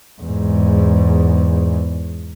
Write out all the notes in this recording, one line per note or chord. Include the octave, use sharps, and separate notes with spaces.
E2 G#2